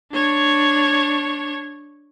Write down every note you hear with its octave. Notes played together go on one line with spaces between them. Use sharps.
D4 C#5